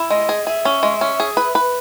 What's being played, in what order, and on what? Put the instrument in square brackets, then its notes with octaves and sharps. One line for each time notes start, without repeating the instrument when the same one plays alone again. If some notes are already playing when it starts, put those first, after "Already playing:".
Already playing: [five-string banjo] E4
[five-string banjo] G#3 [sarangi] D#5
[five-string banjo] G#4
[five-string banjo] G#4 [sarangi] E5
[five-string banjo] C#4
G#3
C#4
G#4
B4
B4